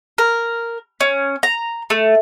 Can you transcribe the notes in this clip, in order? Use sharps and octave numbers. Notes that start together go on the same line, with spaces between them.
A#4
C#4
A#5
A3